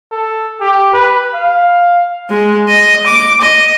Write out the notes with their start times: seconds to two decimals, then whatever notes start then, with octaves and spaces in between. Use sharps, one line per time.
0.12 A4
0.61 G4
0.93 B4
1.34 F5
2.30 G#3
2.69 D#5
3.06 D6
3.42 D#5